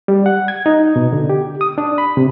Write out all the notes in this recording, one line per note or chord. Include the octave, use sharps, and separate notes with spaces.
G3
F#5
G#6
D#4
B2
D3
G4
D#6
D4
B5
C3